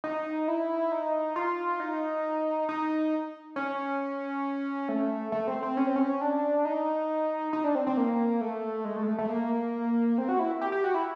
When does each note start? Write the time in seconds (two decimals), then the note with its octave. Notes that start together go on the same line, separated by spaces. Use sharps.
0.04 D#4
0.48 E4
0.92 D#4
1.36 F4
1.80 D#4
2.69 D#4
3.56 C#4
4.89 A3
5.32 A3
5.47 C4
5.63 C4
5.77 C#4
5.87 C4
5.96 C#4
6.21 D4
6.65 D#4
7.53 D#4
7.64 D4
7.75 C4
7.87 C4
7.97 A#3
8.41 A3
8.85 G#3
8.96 A3
9.03 G#3
9.08 A3
9.18 A3
9.29 A#3
10.18 C4
10.29 F#4
10.39 E4
10.61 G4
10.72 G4
10.84 F#4
10.94 E4